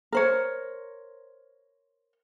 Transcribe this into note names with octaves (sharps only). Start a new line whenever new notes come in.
A#4 C5 C#5